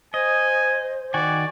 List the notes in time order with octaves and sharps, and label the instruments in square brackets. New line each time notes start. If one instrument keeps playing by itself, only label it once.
[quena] C5 [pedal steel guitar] D#5 [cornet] G#5
[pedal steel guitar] D#3 F#4 G#5 [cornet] D5